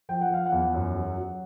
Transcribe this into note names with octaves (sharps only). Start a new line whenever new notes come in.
F3 G5
F#5
F3 F5
F#5
E2
F#2
F#3
F#3